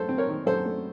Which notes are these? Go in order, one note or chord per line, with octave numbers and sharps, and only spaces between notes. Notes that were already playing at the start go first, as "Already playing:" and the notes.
Already playing: F#2 A3 A4 C5
C4
A#4 C#5
D#3
F#2 A4 C5
A3